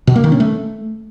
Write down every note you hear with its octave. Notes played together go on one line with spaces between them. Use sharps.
B2
A#3
D#3
C#4
A3